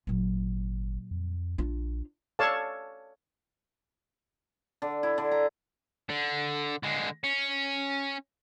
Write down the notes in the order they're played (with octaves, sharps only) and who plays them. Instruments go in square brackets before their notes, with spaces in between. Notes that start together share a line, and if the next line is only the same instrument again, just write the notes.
[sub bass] G#1 [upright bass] A#2 F#3
[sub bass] F2
[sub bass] A#1 [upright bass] D4 F4
[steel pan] A4 C#5 D5 F5 A5
[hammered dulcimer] D3
E4
D3
A#5
[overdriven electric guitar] D3
D3 G#3
C#4